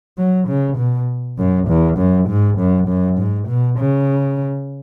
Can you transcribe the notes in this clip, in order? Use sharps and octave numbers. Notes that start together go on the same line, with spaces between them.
F#3
C#3
B2
F#2
E2
F#2
G#2
F#2
F#2
G#2
B2
C#3